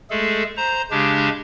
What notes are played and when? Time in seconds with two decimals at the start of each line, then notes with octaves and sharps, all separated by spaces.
0.10 G#3 A3 G#4 A4
0.57 C5 A#5
0.91 C#3 G#3 D4 G4